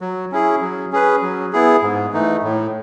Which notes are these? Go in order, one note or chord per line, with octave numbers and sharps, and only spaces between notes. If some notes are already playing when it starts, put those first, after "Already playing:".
F#3
C#4 E4 G#4
F#3
C#4 G#4 B4
F#3
B3 E4 G#4
G#2
E3 A3 D#4
A2